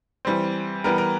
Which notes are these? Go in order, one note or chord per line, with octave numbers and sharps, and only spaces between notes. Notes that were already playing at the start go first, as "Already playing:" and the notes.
E3 G3 C4
E3 G3 B3 A#4
A#4